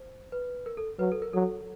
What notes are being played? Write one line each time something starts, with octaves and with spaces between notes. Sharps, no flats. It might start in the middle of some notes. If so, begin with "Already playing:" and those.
Already playing: C5
B4
A#4
A4
F#3 B4
A4
A#4
F#3 A4